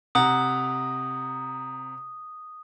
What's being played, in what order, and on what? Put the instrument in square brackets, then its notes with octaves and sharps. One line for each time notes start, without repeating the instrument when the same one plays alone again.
[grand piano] C3 F#5 A#5 [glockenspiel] D#6